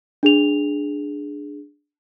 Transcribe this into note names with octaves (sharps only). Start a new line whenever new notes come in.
D4 G#4 F7